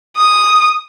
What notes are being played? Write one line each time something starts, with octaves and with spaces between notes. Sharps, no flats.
D#6